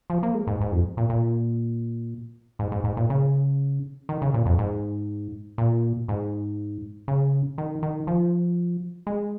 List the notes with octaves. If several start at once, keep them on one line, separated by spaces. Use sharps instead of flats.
F3
A#3
G#3
G#2
G#2
F2
A#2
A#2
G#2
G#2
G#2
A#2
C#3
D#3
C#3
A#2
F2
G#2
A#2
G#2
C#3
D#3
D#3
F3
G#3